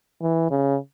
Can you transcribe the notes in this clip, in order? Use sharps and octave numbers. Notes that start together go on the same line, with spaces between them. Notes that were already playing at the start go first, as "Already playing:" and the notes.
E3
C#3